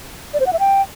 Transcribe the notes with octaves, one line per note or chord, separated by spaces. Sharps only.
D5
C5
F#5
E5
G5